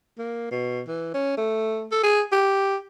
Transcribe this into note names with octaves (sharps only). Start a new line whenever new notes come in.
A#3
B2
E3
C#4
A3
A4
G#4
G4